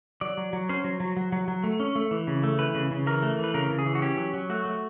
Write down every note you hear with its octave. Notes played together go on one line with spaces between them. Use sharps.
F#3 D5
F#3
F#3
C#4 C5
F#3
F#3
F#3
F#3
F#3
A3
C#4
A3
E3
C#3
A3
E3 B4
C#3
C#3
E3 A#4
A3
E3 B4
C#3 A#4
C#3
G#4
E3
F#4
C#4 G4
F#3
F#3
A3 F#4
A3